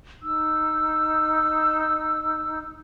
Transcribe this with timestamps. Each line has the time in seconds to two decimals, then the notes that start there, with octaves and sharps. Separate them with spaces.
0.23 D#4 E6